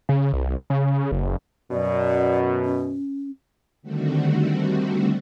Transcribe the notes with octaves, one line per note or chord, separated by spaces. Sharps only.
C#3
C2
C#3
F#1
F#2 B2 D5
C#4
D3 D#3 G3 A3 C4 F#4